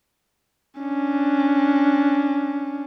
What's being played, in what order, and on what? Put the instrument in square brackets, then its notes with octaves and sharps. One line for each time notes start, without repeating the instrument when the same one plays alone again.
[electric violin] C#4 D4